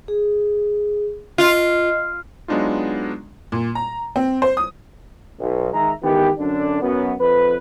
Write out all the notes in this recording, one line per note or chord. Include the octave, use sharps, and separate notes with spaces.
G#4
F4 D#5
F#3 G#3 B3 D4 D#4 F4
A#2
A#5
C4
C5
D#6
B1
D#3 G#3 E5 A#5
D#3 E3 G#3 B3 G4
F#2 D3 D4
F#2 F#3 B3
F2 B4